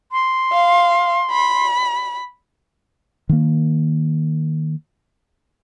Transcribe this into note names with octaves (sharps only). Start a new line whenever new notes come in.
C6
F5
B5
D#3 A#3